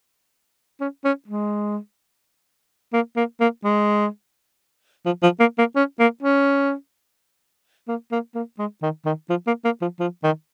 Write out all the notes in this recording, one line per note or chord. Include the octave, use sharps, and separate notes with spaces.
C#4
C#4
G#3
A#3
A#3
A#3
G#3
F3
F3
A#3
A#3
C#4
A#3
C#4
A#3
A#3
A#3
G#3
D#3
D#3
F3
A#3
A#3
F3
F3
D#3